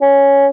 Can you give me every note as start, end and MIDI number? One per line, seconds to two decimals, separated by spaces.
0.01 0.47 61